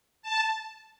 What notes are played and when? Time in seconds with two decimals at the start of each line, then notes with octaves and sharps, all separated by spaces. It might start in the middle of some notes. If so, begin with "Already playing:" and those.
0.22 A5